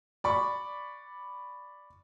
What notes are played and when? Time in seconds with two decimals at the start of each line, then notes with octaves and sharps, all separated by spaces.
0.24 D5 B5 C#6